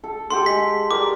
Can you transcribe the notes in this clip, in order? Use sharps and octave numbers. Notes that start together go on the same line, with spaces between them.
A4
G4 A4 F#5 C6
G#3 B6
G4 A#4 D5 D6